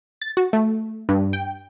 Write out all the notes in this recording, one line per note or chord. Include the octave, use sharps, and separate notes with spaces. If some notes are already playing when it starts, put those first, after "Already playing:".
A6
F#4
A3
G2
G5